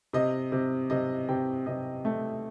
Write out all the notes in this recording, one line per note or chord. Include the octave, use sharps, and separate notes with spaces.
C3 D#5
C3
C3 D#5
C3 G5
C3 D#5
A3